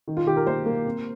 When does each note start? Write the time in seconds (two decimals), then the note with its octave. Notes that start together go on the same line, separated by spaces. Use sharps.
0.08 D#3
0.17 F4
0.26 D#3 G4
0.36 A#4
0.46 A#3 C5
0.66 A#3
0.86 C4